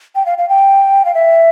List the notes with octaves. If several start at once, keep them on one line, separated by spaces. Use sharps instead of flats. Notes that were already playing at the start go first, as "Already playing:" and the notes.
G5
F5
F5
G5
F5
E5